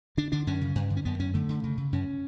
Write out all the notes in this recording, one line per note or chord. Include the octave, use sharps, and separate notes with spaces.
D3 D4
D3 D4
F#2 C#4
C#3
G2
D3
C#4
F#2 B3
F#2 C#4
D3 A3
D3
C#3
C#3
F#2 C#4